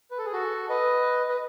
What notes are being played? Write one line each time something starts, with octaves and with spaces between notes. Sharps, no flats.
B4
A4
G#4
F#4 A4
B4 D#5
B4 D#5